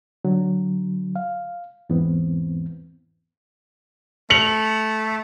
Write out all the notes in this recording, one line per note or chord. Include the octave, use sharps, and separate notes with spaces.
D3 F#3
F5
E2 G#2 E3 B3 C4
A3 C#7 F7 F#7